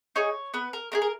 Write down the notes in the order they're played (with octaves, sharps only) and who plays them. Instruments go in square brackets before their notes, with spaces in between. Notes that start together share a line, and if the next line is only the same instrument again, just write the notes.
[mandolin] D#4 G#4 C#5
B3 B4
A#4
D#4 G#4 A#4
A#4